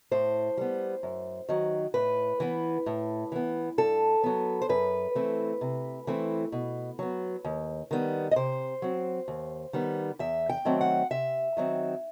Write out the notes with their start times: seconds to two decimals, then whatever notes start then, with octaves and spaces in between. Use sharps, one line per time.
0.11 A2 C5
0.57 G3 B3
1.03 F#2
1.49 D#3 F#3
1.94 A2 B4
2.40 E3 B3
2.86 A2
3.32 E3 B3
3.78 G2 A4
4.23 F#3 B3
4.62 C5
4.69 F#2 B4
5.15 E3 A3 C4
5.61 C3
6.07 E3 A3 C4
6.52 B2
6.99 F#3 B3
7.45 D#2
7.91 D#3 G3 B3
8.31 D#5
8.36 C3 C5
8.82 F#3 C4
9.28 D#2
9.73 D#3 G3 B3
10.19 E2 E5
10.49 G5
10.65 D#3 F#3 A3 C4
10.81 F#5
11.10 C3 E5
11.57 D#3 F#3 C4